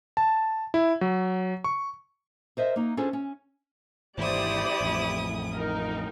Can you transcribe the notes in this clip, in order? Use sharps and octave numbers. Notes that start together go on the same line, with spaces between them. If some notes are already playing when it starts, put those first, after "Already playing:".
A5
E4
F#3
C#6
A#4 C5 D#5 E5
A#3 D#4
C#4 D4 F4 G#4 A4 C5
C#4
G#1 D#2 E3 E4 G4 C5 D5 D#6
A1 F2
D#4 A#4